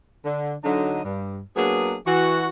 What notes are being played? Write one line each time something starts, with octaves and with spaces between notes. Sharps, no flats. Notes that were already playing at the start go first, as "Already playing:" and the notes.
D3
D3 F#3 D#4
G2
F#3 A#3 B3 D4 G#4
E3 F#4